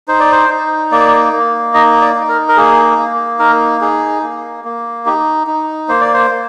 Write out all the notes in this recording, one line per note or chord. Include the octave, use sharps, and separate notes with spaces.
D#4 C5
D5
C5
D#4
A#3 D5
A#3
D#4 D#5
D5
D#4
A#4
A#4
A#3 G#4
A#3
D#4 A#4
D#4 G#4
A#3
A#3
D#4 G4
D#4
A#3 C5
D5
C5
A#3